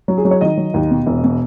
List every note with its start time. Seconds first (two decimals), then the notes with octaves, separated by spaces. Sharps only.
0.08 F#3
0.17 G#4
0.25 F#3
0.31 C#5
0.41 D#3 D#5
0.57 F#3
0.74 D#2
0.91 B2
1.06 E1
1.24 B2